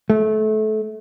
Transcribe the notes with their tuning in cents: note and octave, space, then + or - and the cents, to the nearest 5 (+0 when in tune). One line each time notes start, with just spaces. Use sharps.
A3 -25